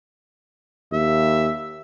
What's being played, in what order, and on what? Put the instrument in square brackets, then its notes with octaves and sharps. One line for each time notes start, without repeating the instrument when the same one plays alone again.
[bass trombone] D#2 [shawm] E5